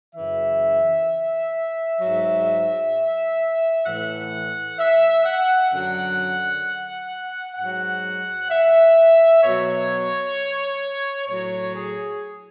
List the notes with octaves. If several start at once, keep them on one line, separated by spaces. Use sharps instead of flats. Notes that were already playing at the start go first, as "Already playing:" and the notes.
F#2 C#3 E3 E5
G#2 F#3
A2 E3 F#5
E5
F#5
F#2 D3 F#3 F#5
G#2 F#3 F#5
E5
B2 F#3 C#5
A2 F#3 C#5
G#4